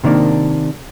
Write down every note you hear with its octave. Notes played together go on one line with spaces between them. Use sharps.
C3 D#3 A#3 D4